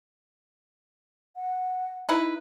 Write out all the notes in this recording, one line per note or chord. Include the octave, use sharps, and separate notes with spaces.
F#5
D#4 E4 B4